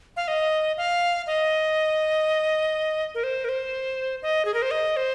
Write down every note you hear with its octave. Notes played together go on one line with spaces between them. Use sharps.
F5
D#5
F5
D#5
A#4
C5
A#4
C5
D#5
G#4
A#4
C5
D#5
C5